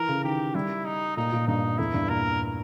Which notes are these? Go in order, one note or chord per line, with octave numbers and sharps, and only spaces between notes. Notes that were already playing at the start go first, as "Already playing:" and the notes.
Already playing: E3 A#4
C#3
D#3 G4
G3 E4
D#4
A#2 D#4
A#2
G2 D#4
E2 E4
G2
A#2 A#4